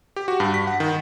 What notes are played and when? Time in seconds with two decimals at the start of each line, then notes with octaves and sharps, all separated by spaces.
0.16 G4
0.28 F#4
0.40 G2
0.54 B6
0.67 F#5
0.80 D#3